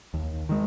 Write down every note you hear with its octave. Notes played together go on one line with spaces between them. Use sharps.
D#2
D#3 G#3